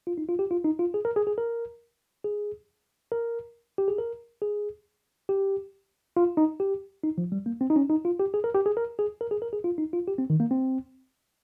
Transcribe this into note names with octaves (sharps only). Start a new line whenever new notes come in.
F4
D#4
F4
G4
F4
D#4
F4
G#4
A#4
G#4
G#4
A#4
G#4
A#4
G4
G#4
A#4
G#4
G4
F4
D#4
G4
D#4
F3
G3
A#3
C4
D#4
C#4
D#4
F4
G4
G#4
A#4
G4
G#4
A#4
G#4
A#4
G#4
A#4
G#4
F4
D#4
F4
G4
C4
D#3
A#3
C4